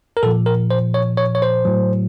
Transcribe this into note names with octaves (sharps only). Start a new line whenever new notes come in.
A#4
A#2 F3 A4
A#4
C5
C#5
C#5
C#5
C5
A2 F#3